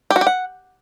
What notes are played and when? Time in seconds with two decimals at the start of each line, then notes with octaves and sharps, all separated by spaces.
0.10 G4
0.16 F#4
0.21 G4
0.27 F#5